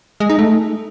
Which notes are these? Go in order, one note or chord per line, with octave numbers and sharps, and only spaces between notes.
G#3
D#4
A3